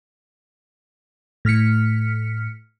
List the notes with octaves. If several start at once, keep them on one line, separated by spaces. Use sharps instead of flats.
A2 F6 B6 C#7